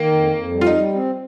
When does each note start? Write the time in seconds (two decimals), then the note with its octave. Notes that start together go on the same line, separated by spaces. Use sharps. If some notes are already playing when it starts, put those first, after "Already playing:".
Already playing: D#3 A#3
0.12 F2
0.33 F2
0.53 G3
0.61 F4
0.67 D#4
0.73 G3
0.93 C4